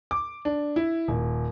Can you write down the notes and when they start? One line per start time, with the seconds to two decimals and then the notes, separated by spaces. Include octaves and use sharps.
0.11 D6
0.45 D4
0.76 E4
1.08 D#1